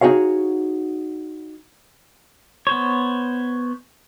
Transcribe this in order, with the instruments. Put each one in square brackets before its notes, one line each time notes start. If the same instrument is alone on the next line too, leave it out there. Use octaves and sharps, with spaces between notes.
[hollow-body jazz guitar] D#4 F#4 G#4 C#5 F5
[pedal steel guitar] B3 C5 C#5